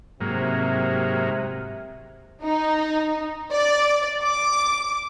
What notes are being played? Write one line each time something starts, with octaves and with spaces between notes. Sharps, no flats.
G#2 C3 F#3 A#3
D#4
D5
D6